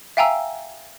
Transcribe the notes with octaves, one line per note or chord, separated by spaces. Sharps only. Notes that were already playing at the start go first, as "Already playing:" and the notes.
E5 F5 G5 G#5 A#5 E6